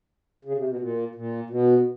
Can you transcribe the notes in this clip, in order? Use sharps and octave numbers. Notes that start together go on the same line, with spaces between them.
C#3
C3
B2
A#2
A#2
B2